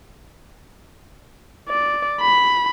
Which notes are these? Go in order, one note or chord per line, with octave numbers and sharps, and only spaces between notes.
D5
B5